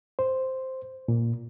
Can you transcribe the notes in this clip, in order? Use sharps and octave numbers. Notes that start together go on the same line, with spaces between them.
C5
A#2